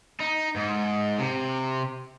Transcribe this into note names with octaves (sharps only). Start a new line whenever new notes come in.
D#4
G#2
C3